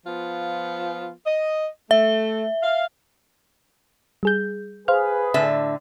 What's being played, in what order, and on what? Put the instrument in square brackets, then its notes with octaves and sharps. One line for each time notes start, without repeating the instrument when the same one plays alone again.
[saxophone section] F3 B3 F4
D#5
[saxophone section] A3 [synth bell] E5
[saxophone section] F5
[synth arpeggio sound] G3 G#4 G6
[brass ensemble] G#4 B4 [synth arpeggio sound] C5 F5 F6
[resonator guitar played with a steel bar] A2 D3 E5